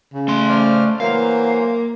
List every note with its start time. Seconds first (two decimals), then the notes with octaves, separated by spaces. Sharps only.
0.13 C#3
0.28 A3 C6
0.49 C5 D5 F6
1.00 E3 F#3 A#3 C5 F5